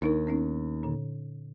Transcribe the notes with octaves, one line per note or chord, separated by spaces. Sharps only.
D#2 D4 D#4 A#4
B3 C#4 D#4
A#2 D3